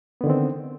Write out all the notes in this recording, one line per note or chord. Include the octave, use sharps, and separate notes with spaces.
D3 D#3 B3 C4